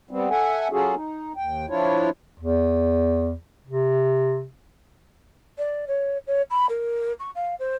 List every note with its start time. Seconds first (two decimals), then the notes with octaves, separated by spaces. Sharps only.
0.11 G3 B3 C4
0.30 A4 E5 F#5 G#5
0.72 F#3 C#4 F4 F#4 G#4 A4
0.95 D#4
1.37 D#2 G5
1.69 F3 D4 E4 F4 C#5
2.39 E2
3.67 C3
5.58 D5
5.88 C#5
6.27 C#5
6.50 B5
6.69 A#4
7.20 C#6
7.35 F5
7.59 C5